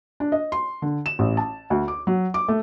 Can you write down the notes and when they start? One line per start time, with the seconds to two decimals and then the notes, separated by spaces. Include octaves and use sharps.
0.20 D4
0.32 D#5
0.52 C6
0.82 D3
1.06 E7
1.19 A1
1.37 A5
1.70 D2
1.88 D6
2.07 F#3
2.34 D6
2.48 A3